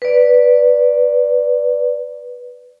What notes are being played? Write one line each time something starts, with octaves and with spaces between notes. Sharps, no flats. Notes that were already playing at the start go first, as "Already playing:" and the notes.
B4 D5